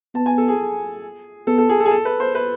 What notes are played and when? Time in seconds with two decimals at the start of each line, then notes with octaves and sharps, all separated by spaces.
0.15 B3 A5
0.26 G#5
0.38 A4
0.48 G#4
1.47 B3 A4
1.58 A4
1.69 G#4
1.80 A4
1.86 G#4
1.91 A4
2.05 B4
2.20 C5
2.35 B4